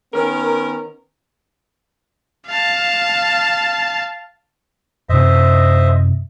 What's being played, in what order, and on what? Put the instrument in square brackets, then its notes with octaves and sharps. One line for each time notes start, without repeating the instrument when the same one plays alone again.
[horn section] D#3 B3 C#4 A#4
[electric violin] F5 A5
[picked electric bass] F#2 C3 C4 [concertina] C5 D#5 E5